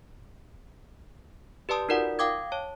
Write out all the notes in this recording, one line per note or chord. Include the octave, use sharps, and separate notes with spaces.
G4 B4 D5 A5 D#6
D#4 F4 F#4 A#4 D5 F#5
F5 G5 D6 D#6 G#6
C#5 A5